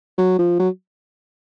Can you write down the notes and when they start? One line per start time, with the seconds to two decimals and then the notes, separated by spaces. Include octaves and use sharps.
0.18 F#3
0.39 F3
0.59 F#3